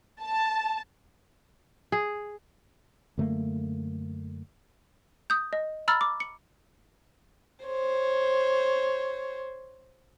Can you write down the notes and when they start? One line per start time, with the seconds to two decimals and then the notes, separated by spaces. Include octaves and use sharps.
0.21 A5
1.92 G#4
3.18 F#2 D3 A3 A#3
5.30 D#6 G6
5.53 D#5
5.88 A#5 B5 E6 F6 A6
6.01 D6
6.20 C#7
7.65 C5 C#5